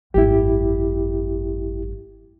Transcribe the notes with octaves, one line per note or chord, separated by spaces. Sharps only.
G#1 F#2 E4 G4